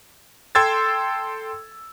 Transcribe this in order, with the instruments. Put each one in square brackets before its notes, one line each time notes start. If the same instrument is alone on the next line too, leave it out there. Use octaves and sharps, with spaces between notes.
[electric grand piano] A4 G5 C6 E6 G#6 A6